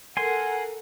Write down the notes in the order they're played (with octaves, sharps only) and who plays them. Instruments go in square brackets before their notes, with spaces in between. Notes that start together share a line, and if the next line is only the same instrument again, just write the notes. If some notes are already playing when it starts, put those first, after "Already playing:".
[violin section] A4 A#4 F#5 [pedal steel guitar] G#5 C6